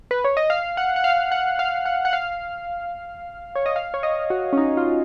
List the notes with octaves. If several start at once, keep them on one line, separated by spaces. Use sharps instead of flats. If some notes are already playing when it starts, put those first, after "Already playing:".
B4
C#5
D#5
F5
F#5
F#5
F5
F#5
F5
F#5
F#5
F5
C#5
D#5
F5
C#5
D#5
F#4
C#4
D#4
F4